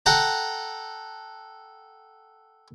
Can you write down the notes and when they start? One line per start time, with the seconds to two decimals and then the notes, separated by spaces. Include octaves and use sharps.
0.06 A4 F#5 G5 A5 A#5